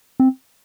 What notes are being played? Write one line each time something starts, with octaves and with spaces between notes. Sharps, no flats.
C4